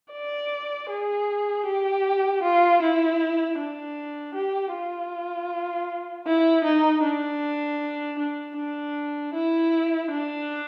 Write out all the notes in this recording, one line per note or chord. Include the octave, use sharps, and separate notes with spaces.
D5
G#4
G4
F4
E4
D4
G4
F4
E4
D#4
D4
D4
D4
E4
D4